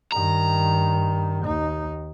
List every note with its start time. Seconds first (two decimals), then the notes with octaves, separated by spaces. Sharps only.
0.12 G2 D#3 A#5
1.44 D#2 D#4